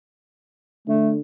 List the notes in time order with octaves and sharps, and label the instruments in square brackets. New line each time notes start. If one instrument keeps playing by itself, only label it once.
[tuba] D3 [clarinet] A3